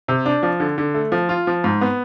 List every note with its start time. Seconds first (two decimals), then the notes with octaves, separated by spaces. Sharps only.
0.08 C3
0.26 D4
0.43 F3
0.60 D3
0.78 D3
0.94 A3
1.12 F3
1.29 F4
1.47 F3
1.64 G#2
1.81 B3